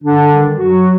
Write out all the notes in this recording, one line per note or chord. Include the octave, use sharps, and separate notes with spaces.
G2 D3 D4
D#3 G3
F#2 F#3 F#4